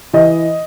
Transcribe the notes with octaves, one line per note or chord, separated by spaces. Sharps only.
E3 D#5